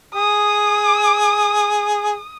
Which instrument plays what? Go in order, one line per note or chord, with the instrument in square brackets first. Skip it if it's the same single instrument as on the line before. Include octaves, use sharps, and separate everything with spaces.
[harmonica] G#4 [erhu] D#6